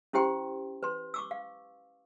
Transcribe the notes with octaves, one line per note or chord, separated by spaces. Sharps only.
C#4 E4 G4 C5 G5 C6
B4 C6
C#6 D6 E6
F5